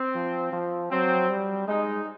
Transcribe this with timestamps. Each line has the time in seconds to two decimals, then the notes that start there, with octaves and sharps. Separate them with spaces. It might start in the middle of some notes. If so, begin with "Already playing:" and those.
Already playing: C4
0.15 F3
0.53 F3
0.91 F#3 C4
1.29 G3
1.67 G#3 D#4